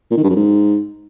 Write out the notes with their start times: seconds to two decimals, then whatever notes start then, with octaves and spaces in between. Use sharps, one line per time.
0.11 A#2
0.17 D#3
0.23 G2
0.30 F#2
0.36 G#2